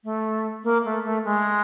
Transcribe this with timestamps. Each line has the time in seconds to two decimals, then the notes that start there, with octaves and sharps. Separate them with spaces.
0.04 A3
0.64 A#3
0.85 A3
1.04 A3
1.24 G#3